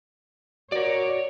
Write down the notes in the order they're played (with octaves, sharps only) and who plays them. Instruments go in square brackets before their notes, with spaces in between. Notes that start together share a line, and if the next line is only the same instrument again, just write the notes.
[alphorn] F#4 [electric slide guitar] A#4 D5 [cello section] C#5